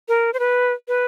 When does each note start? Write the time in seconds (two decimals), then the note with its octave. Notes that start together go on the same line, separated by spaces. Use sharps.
0.08 A#4
0.34 C5
0.39 B4
0.88 B4